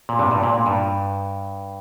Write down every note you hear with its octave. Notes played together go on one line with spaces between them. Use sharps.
A#2
G2 C3
G2
A#2
A#2
G2